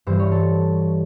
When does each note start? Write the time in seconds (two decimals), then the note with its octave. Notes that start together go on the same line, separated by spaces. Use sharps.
0.07 G2 E3 G3 C5
0.19 C#5
0.32 A4